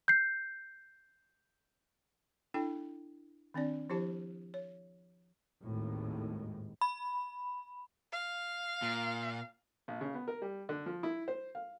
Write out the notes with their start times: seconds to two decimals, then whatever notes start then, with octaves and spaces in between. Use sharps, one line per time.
0.08 G6 C7
2.54 D4 E4 A4 G5
3.54 D#3 C4 D4 D5
3.90 F3 E4 G4 C5 A5
4.54 C#5
5.62 G#1 D#2 A2
6.81 B5
8.12 F5
8.82 A#2
9.88 A#1
10.01 C#3
10.14 B3
10.28 A#4
10.42 G3
10.69 D3
10.86 F3
11.03 E4
11.28 C5
11.55 F5